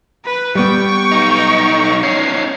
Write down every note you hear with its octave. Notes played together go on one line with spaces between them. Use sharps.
B4
G3 B3 G5 C#6
B1 D#4
C#4 D#4 C7